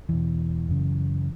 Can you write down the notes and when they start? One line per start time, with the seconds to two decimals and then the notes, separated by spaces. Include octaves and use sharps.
0.09 E2 B2 E3
0.69 F#2 C#3